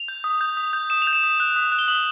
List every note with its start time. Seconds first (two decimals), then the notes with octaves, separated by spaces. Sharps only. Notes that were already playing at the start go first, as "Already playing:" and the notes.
Already playing: F7
0.08 G6
0.24 D#6
0.41 G6
0.57 D#6
0.73 G6
0.90 D#6 E7
1.02 F7
1.07 G6
1.13 E7
1.23 D#6
1.40 F#6
1.56 D#6
1.72 F#6
1.79 G7
1.88 D#6 F#7